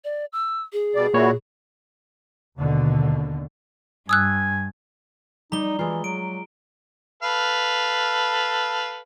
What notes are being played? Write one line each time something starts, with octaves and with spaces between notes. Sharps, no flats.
D5
E6
G#4
B2 G3 D5
A#2 E4 F#4 C#5
D#2 B2 D3
G2 G#5 D#6 E6 F#6
G3 D#4 A#5 G7
E3 G#3 F4
F#3 D7
A4 B4 F5